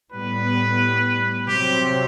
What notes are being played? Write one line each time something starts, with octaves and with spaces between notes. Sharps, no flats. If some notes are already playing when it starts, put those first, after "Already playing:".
A2 G3 B3 B4
C3 F#3 C4 G4